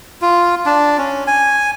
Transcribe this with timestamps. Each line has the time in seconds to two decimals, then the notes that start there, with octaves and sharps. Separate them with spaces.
0.22 F4
0.66 D4
0.98 C#4
1.27 G#5